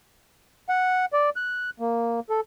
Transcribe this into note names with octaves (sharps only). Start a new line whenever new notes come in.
F#5
D5
F#6
A#3
A4